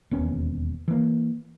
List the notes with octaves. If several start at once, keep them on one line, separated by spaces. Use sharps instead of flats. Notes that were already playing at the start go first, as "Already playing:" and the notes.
E1 D#2 B3 C#4
E3 A#3